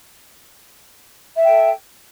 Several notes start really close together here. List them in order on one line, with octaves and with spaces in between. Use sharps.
E5 G5 A4